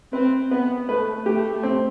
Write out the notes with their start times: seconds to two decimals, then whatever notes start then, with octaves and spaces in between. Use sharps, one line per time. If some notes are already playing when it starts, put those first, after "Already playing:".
0.13 C4 B4
0.51 B3 B4
0.89 A3 B4
1.26 A3 G4
1.63 C4